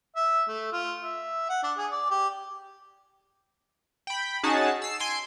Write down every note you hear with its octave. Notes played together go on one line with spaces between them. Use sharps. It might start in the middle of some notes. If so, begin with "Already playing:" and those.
E5
A3
F4
E5
F#5
D4
G#4
D5
G4
G5 B5
C#4 D#4 F#4 G#4 A5
E6 C7
G#5 C6 C7 D7